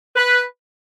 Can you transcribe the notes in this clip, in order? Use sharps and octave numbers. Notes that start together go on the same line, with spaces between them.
B4